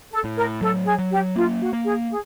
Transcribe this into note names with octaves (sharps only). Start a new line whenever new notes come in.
A4
A2
A#4
F#3 A4
G#4
F#3
G4
A#3 F4
F#4
A#3
G#4
G#4